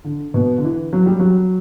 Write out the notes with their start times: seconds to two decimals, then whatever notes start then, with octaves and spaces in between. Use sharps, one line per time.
0.04 D3
0.34 B2
0.58 D3
0.64 E3
0.93 F#3
1.06 G3
1.19 F#3